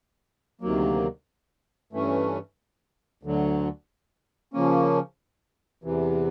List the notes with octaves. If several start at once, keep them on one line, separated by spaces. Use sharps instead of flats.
D2 C3 D#3 F#3 A#3
G2 E3 A3 C#4
D2 D3 F#3
C#3 F3 A#3 C#4
E2 C3 E3